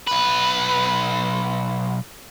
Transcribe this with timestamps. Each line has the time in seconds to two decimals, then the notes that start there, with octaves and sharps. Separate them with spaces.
0.07 B1 B4